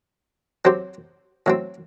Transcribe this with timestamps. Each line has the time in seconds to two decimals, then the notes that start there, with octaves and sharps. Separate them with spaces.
0.65 F#3 C4 G4 C5
1.46 A2 F#3 C4